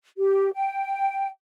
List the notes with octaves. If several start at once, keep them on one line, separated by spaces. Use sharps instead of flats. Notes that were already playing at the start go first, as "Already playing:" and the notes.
G4
G5